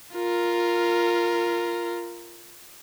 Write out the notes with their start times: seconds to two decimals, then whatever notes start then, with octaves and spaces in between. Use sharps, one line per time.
0.15 F4 A#4